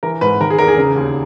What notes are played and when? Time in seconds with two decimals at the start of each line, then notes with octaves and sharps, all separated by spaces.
0.03 E3 A#4
0.21 G#2 B4
0.41 D#3 A#4
0.50 G#4
0.59 E2 A#4
0.68 G#4
0.77 C#3
0.96 D#2